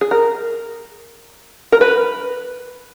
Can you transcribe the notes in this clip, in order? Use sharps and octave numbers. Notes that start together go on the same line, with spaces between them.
G#4
A#4
A#4
B4